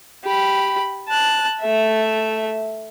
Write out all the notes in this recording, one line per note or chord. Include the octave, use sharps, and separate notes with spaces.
G4 B5
A5 F#6
A3 E5